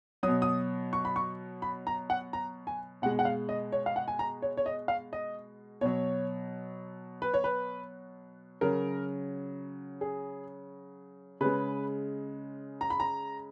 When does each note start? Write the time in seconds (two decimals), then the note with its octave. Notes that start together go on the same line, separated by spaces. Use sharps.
0.23 F#3 D#6
0.28 B2
0.42 D#6
0.93 C#6
1.05 B5
1.16 C#6
1.62 B5
1.87 A#5
2.10 F#5
2.33 A#5
2.67 G#5
3.02 B2 F#5
3.06 G#3
3.19 F#5
3.25 F5
3.49 D#5
3.72 C#5
3.86 F5
3.96 F#5
4.08 G#5
4.19 A#5
4.42 C#5
4.57 C#5
4.66 D#5
4.88 F5
5.13 D#5
5.81 B2 F#3 C#5
7.22 B4
7.34 C#5
7.44 B4
8.61 C#3 F#3 A#4
10.01 G#4
11.41 C#3 G#3 B4
12.81 A#5
12.90 B5
13.00 A#5